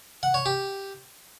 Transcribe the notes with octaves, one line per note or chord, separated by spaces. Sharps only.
F#5
C#5
G4